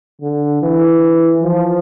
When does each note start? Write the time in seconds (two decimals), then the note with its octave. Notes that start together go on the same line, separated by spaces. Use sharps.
0.22 D3
0.62 E3
1.43 F3